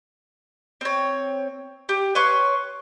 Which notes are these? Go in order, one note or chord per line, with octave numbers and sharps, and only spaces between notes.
C4 C#5
G4
B4 C#5 C6 C#6